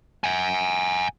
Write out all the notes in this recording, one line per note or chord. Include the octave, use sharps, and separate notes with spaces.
F#5 G#5